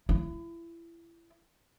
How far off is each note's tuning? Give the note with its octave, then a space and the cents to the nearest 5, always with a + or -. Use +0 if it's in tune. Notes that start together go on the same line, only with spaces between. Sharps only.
E4 +30